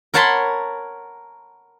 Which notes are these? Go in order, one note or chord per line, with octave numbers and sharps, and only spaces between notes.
A#4 C#5 F#5 A5 B5 C6